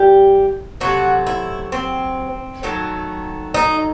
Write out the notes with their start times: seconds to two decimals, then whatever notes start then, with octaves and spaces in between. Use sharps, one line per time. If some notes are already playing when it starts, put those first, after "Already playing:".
Already playing: G3 G4
0.80 C3 F#3 A3 F#4
1.27 E4
1.72 C4
2.63 D#3 F#3 A3
3.54 D#4